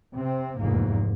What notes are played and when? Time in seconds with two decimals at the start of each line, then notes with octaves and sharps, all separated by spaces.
0.16 C3 C4
0.59 F1 E2 G#2 A#3